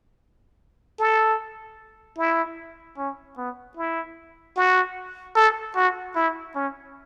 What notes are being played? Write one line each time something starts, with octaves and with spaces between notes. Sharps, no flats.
A4
E4
C#4
B3
E4
F#4
A4
F#4
E4
C#4